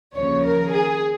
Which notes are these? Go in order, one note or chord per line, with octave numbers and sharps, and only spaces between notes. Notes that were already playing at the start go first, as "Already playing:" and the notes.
D#2 C#3 F3 C#5
A#4
G#4